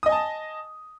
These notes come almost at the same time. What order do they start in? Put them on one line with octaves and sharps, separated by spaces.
D#6 D#5 G#5 A5